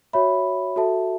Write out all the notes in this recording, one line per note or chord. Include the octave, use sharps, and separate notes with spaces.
F#4 C#5 E5 B5
F#4 A4 E5 A5